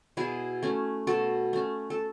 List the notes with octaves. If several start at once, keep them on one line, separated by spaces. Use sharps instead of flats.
B2 E4 G#4
A3 C#4
B2 F#4 A4
A3 C#4
A4